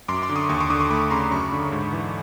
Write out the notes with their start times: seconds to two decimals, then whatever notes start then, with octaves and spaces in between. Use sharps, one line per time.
0.08 F#2 C6 D6
0.22 C6 D6
0.29 D3
0.36 C#6 D#6
0.49 D#2 C#6 D#6
0.60 C6 D6
0.70 D3 C#6 D#6
0.80 C6 D6
0.91 A3 B5 C#6
1.11 C#3 A#5 C6
1.31 F#2 B5 C#6
1.52 D3
1.72 G#2
1.93 E3